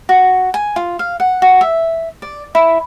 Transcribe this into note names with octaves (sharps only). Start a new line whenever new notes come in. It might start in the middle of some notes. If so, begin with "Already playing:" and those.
F#4
G#5
F4
F5
F#5
F#4
E5
D5
E4